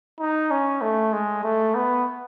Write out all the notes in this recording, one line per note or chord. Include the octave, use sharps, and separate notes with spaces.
D#4
C#4
A3
G#3
A3
B3